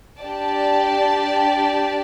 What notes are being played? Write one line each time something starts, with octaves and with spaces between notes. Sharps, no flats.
D4 G4 D5 A5